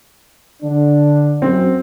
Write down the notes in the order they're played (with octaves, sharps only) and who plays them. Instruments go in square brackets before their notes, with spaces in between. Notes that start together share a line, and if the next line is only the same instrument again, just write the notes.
[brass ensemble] D3 D4
[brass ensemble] F#2 [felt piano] C4